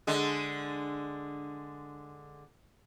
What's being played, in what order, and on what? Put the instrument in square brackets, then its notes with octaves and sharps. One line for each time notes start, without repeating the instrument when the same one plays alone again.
[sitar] D3 G#3